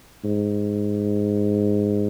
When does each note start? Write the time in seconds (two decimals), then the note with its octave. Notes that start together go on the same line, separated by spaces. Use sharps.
0.25 G#2